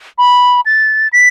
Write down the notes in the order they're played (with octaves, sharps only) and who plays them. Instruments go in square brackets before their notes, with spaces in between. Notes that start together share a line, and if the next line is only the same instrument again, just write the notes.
[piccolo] B5
A6
B6